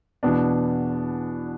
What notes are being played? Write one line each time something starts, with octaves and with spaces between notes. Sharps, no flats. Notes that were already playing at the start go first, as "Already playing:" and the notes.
E2 B2 B3 D4